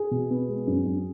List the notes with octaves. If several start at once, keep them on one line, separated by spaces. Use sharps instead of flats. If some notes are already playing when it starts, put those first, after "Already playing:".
Already playing: G#4
B2
B3
G#3
F#2
F#2